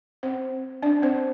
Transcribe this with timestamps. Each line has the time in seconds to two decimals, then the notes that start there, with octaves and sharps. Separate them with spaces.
0.23 C4 C5
0.82 D4 D5
1.02 C4 C5